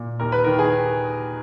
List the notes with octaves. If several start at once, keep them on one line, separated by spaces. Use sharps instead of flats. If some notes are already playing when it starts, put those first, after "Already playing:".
Already playing: A#2
D#2 A#4
B4
D#3 A#4
G#4